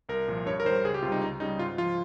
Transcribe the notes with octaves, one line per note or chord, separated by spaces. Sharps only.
C2 A#4
A#2 F3
G2 C#5
A#4
D#3 G3 C5
C#2 G#4
G4
C3 F4
G3 D#4
C#2 D#4
C#3 G3 D#4
G#2 F4
F3 F4